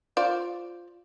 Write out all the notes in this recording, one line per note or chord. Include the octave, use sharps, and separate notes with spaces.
F4 C5 D5